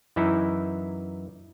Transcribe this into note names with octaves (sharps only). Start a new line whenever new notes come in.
F#2 E3 D#4 E4